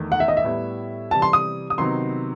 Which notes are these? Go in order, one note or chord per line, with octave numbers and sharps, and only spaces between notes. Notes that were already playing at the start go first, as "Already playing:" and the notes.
Already playing: E2 D#3 A3
F#5
E5
D#5
E5
A2 G3 B3 E4
C3 E3 G3 A5
C6
D#6
D#6
C3 D#3 F#3 B3 D#4 C6